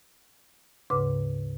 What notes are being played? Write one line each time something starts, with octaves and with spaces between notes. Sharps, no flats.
D2 G#2 C#3 B4 D6